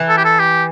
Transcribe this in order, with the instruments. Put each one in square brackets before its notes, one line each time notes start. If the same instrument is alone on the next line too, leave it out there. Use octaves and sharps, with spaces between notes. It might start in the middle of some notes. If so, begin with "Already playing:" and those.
Already playing: [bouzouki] E3
[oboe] A4
G4
A4
G4